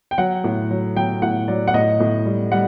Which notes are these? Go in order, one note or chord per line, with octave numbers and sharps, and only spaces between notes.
G5
F#3 F#5
A2
F#3
F#3 G5
A2 F#5
F#3 D5
F#5
A2 D#5
A2
G3
G3 F#5